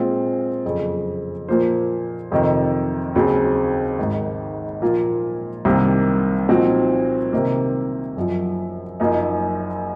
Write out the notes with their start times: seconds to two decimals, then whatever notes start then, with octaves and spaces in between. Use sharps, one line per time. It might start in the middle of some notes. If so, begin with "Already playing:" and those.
Already playing: A#2 G#3 C4 F4
0.65 F#1 F2 C#3
1.49 A#2 F3 A#3 F4 C5
2.31 F2 C3 D#3
3.15 D#2 C#3 F#3 C4
3.99 G#1 G#2 D#3
4.82 A#2 F3 A#3 F4
5.65 C2 C3 D#3 A#3 D#4
6.49 A#2 F3 C4 D#4 F#4
7.33 C3 D#3 A#3
8.16 F#1 F#2 F3
9.00 F#1 F#2 F3 A#3 D#4